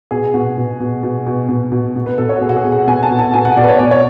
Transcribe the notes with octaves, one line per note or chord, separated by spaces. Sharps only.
B2 G#4
B2 F#4
B2
B2
B2
B2
B2
B2
B2
B4
B2 A4
C#5
F#4
B2 G#4
F#4
G#4
B2
F#5
B2 G#5
A5
B2
A5
B2 G#5
F#5
B2 D5
B4
C#5
B2 D5
C#5